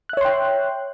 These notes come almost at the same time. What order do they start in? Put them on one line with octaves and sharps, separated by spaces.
F#6 E5 C#5 C6 G5